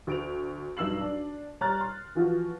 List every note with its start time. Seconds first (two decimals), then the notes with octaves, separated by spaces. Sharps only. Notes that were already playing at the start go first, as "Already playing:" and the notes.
0.07 D2 D7 F7
0.77 B1 G2 E6 C7 F#7
1.01 D4
1.61 G3 C#5 A#5 F6 F#6 A6
1.81 C6
2.15 E3 F3 F4 F#4